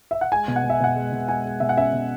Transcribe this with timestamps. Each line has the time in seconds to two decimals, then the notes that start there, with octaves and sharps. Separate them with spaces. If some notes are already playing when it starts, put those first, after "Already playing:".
0.11 E5
0.21 F#5
0.32 G#3 G#5
0.48 B2
0.56 F#5
0.64 B2
0.70 E5
0.80 B2 F#5
0.96 G#3
1.12 B2
1.29 G#3 G#5
1.45 G#3
1.60 B2 E5
1.69 F#5
1.76 C#4 E5
1.93 B2